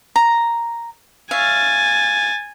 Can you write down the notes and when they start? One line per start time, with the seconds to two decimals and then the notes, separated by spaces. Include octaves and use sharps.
0.16 A#5
1.31 C#5 E5 F5 G#5 A6